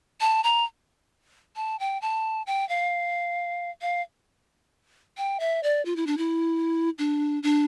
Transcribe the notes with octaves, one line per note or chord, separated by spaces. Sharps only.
A5
A#5
A5
G5
A5
G5
F5
F5
G5
E5
D5
F4
E4
D4
E4
D4
D4